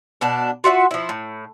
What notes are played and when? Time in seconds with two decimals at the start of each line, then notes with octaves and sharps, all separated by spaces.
0.21 B2 D4 A5
0.64 F4 F#4 E5 F#5
0.91 F3 E4
1.09 A2